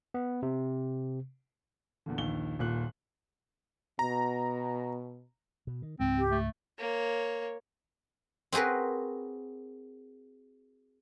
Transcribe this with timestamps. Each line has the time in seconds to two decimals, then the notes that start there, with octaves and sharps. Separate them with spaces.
0.14 B3
0.43 C3
2.06 E2 A#2 D3
2.18 A#1 D#2 G7
2.59 D#1 A#2 F#6
3.99 B2 A#5
5.67 B2
5.82 D#3
6.00 C#2 G#2 G#3 C4
6.18 G4
6.31 A3
6.78 A#3 C#5
8.52 C4 F#4 G#4 A#4 B4